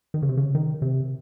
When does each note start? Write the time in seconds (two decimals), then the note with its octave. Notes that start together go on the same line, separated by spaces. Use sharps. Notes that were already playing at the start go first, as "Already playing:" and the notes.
0.14 D#3
0.22 C#3
0.29 C3
0.37 C#3
0.55 D#3
0.82 C3